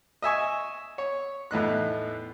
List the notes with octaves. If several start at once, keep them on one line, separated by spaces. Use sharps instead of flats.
D#5 E5 G#5 C#6
C#5
E2 A2 D#4 F#6